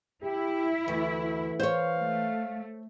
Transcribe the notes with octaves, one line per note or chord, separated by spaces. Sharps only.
E4 G4
D2 E3
C5 C#5 F5
A3